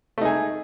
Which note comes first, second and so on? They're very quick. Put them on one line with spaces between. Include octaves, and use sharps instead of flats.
A3 D#4 G#4